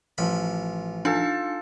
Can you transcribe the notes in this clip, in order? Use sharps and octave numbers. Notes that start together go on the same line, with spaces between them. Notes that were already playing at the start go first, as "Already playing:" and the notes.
A1 F3 B5
D4 D#4 F4 A4 G#5